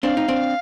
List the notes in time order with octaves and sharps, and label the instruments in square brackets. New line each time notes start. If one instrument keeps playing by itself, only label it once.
[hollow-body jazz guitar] C4 D4 [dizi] F5
[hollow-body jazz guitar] D#4
C4 D4